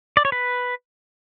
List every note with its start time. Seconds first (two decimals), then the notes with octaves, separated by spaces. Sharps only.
0.17 D5
0.25 C#5
0.32 B4